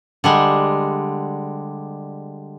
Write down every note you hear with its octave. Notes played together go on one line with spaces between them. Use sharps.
D3 G3 G#3